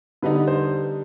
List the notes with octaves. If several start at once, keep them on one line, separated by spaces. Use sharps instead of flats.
D3 G3 B3 D#4 B4
C5